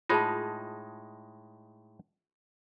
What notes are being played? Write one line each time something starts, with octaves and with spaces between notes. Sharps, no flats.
A2 G#3 D#4 F4 G#4 A5